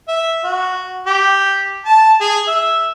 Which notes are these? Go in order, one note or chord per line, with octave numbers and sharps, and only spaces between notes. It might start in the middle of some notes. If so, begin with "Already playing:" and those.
E5
F#4
G4
A5
G#4
E5